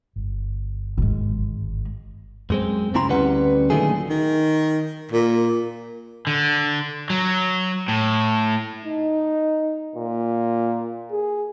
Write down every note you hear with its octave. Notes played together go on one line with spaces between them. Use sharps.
G1
G#1 G#3
F#2 G#3 C4
C2 C#3 C4 E4 A#5 C6
D2 G3 C#4 B4 F#5
A#2 D3 D#3 F#3 A3 G#4
D#3
A#2
D3
F#3
A2
D#4
A#2
G#4